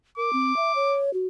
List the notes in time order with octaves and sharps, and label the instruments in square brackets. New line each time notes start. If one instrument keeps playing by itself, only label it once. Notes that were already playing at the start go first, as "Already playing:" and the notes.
[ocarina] A#4 [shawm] D6
[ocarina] C4
E5
C#5
F#4